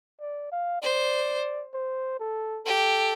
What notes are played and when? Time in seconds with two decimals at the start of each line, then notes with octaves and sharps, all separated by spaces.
0.20 D5
0.52 F5
0.82 C5 D5
1.73 C5
2.19 A4
2.66 G4 A4